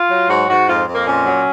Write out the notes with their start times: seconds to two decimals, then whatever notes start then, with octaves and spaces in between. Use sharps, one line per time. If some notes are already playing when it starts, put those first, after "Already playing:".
Already playing: F4
0.10 F#3
0.29 G#2 F#4
0.48 G#2 F#4
0.69 F2 F4
0.87 F2
0.94 A#3
1.07 A#2 C#4
1.26 F#3